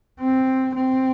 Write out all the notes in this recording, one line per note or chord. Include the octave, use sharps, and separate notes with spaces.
C4
C4